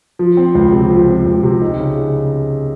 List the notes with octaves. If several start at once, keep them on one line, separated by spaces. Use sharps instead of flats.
F3
C4
C#2
C3
F3
C4
C#2
C3
D#4
C#3